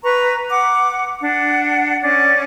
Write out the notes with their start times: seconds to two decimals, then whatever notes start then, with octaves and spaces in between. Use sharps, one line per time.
0.03 B4 A#5 C#6
0.51 F#5 D6
1.21 D4 F#5
2.02 C#4 D5